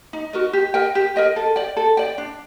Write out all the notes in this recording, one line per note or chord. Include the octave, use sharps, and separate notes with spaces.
D#4
F#4 A#4 D#5
G4
A#4 D#5 G5
G4
A#4 D#5 G5
A4
D5 G5
A4
D5 G5
D4